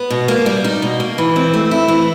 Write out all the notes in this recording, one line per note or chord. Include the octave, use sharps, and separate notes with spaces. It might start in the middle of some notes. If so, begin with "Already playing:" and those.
Already playing: B3
B2
A#3
G3
D#4
B2
A#3
E3
C4
A3
E4
E3